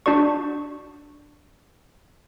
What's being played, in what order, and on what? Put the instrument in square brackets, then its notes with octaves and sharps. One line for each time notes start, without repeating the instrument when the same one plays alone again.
[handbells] D4 F#4 D5 C#6